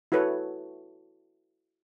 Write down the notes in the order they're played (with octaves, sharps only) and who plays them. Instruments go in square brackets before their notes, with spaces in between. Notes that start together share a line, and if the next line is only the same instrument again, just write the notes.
[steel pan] E4 F#4 A4 B4 C#5